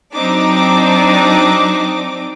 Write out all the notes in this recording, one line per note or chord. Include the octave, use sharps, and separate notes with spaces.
F#3 C4 D4 D#4 D6